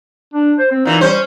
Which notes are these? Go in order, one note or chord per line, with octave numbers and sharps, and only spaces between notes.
D4
C5
C4
A#2 E3 D#4
G3 C#4 C5